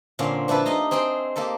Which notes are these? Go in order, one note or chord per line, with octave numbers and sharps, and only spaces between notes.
A#2 D3 C4 C#4 D5 F5
F3 D4 E4 A4 B4
D#4 G4 D#5 F5 A#5
C4 G#4 G5 C6
A#3 G4 A4 A#4